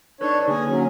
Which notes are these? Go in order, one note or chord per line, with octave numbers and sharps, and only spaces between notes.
D4 D#4 A4 B4 C#5
D3 A#3 G#4
F#3 C#4